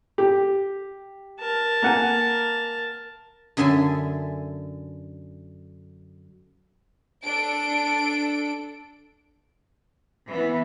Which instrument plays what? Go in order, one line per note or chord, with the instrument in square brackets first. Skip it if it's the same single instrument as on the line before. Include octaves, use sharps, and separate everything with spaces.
[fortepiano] G4
[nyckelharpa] A#4 A5
[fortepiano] A#3 F#5 G#5
[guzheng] F#2 D3 A4 E5 G#5
[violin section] D4 A4 D7
[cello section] E3 B3 [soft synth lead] E5